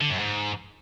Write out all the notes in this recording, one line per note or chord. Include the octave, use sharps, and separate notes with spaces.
D3
F#2
G#2